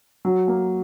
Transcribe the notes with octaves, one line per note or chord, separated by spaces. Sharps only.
F#3
A#3